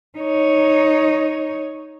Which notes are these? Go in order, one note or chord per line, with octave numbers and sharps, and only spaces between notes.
D#4 C#5